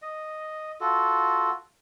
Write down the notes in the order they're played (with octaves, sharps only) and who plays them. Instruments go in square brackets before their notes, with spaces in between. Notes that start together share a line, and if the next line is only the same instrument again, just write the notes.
[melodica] D#5
F4 F#4 A4